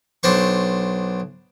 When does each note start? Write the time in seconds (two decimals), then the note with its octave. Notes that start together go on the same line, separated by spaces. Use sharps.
0.23 B1 D4 C5 C#6